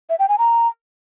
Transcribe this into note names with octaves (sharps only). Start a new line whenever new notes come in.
E5
G5
G#5
A#5